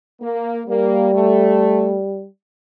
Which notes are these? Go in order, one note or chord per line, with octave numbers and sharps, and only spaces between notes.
A#3
G3 A#3
A3